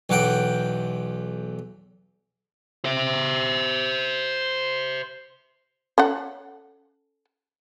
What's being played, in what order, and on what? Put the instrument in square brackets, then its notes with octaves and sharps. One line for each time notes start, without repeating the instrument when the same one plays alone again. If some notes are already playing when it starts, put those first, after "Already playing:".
[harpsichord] B1 E2 F#5 G5
[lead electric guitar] C5 E5
[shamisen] C#4 A4 F#5